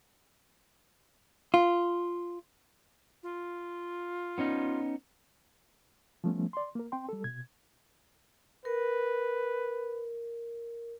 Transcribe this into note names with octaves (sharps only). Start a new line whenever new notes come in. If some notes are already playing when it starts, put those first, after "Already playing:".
F4
F4
B3 C#4 D#4
F3 G3 A3 B3 C#4
D5 C6
A#3 A#4
C4 G5 C6
G3 A4
B2 G#6
A#4 B4